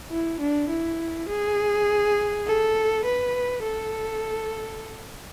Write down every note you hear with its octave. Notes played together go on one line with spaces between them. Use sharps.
E4
D4
E4
G#4
A4
B4
A4